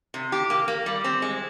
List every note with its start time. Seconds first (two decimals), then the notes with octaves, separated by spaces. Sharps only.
0.14 C3
0.32 G4
0.50 A#3
0.68 A#3
0.86 G3
1.04 C4
1.22 G#3